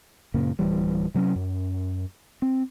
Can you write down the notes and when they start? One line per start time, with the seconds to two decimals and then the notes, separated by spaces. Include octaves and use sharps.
0.34 F#2 A#2 C#3 A#3
0.59 D1 E3 G3
1.14 C3 F#3 G3 C#4
1.36 F#2
2.42 C4